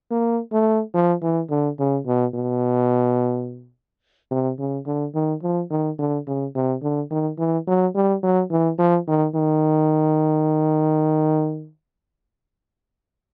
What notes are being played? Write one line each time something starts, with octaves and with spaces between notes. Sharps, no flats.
A#3
A3
F3
E3
D3
C#3
B2
B2
C3
C#3
D3
D#3
F3
D#3
D3
C#3
C3
D3
D#3
E3
F#3
G3
F#3
E3
F3
D#3
D#3